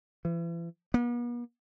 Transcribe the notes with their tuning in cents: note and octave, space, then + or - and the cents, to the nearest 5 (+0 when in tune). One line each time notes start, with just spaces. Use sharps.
E3 +40
B3 -45